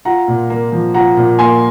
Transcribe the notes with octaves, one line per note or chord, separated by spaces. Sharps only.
F4 F#5 A#5
A#2
A#3
F3
F4 F#5 A#5
A#2
A#3 G#5 C6